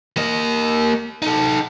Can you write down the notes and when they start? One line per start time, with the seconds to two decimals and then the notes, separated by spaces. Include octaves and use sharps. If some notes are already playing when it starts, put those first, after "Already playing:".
0.17 A#3 D#5
1.22 D#4 A4